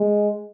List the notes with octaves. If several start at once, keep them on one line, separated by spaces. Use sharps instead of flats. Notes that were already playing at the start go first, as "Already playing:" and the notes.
Already playing: G#3